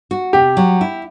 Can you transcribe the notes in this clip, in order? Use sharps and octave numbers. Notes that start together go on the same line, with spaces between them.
F#4
C3 G4
F#3
E4